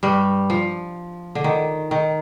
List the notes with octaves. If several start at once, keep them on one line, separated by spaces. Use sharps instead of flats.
G2 G3
F3
D3
D#3
D#3